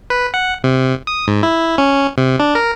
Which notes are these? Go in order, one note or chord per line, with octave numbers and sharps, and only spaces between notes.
B4
F#5
C3
D#6
G#2
E4
C#4
C3
D4
A#4